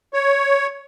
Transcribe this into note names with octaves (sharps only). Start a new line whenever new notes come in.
C#5